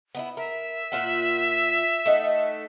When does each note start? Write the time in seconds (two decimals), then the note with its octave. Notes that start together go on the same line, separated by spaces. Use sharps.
0.15 B3 D#4 E4
0.37 A#4 E5
0.92 A#2 F4 F#5
2.06 A3 D#4 F#5